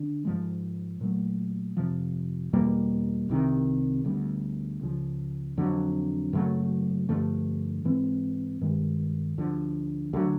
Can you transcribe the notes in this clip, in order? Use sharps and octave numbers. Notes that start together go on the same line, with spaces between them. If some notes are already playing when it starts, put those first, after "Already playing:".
Already playing: D3
G#2 F3 G#3
A#2 F#3 A3
F2 C3 F3
E2 B2 G3 A#3
C2 C3 D#3
D2 D3 G3 B3
C#2 C#3 F3
F2 D3 F#3
F#2 C#3 F#3 A3
G2 D3 F3 A3
G#2 E3 G#3 C4
G2 D#3 G#3
D2 D3 F3
D2 D3 F#3